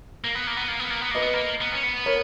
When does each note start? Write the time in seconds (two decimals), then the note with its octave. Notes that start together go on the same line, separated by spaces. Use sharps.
0.24 A#3
0.35 B3
0.47 A#3
0.57 B3
0.68 A#3
0.79 B3
0.90 A#3
1.01 B3
1.11 A#3 B4 D#5
1.22 B3
1.33 A#3
1.61 B3
1.72 C#4
1.83 B3
2.06 A#4 C#5